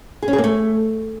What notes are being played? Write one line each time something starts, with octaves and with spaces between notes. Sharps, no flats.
G#4
C#4
G#4
A#3
A3